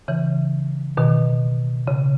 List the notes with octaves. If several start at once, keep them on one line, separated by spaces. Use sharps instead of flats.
C#3 E3
B2 D#3
C#3